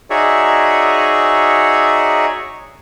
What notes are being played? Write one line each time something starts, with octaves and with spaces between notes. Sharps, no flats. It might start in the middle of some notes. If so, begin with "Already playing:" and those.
D#4 F#4 G#4 C#5 D5 E5